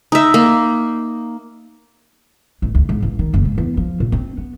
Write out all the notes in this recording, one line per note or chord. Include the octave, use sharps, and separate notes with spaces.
D#4 E5
A#3
A1
D2
G#2
A1
D#3
F#1
G#2
E2
F3
A#2
C4
B3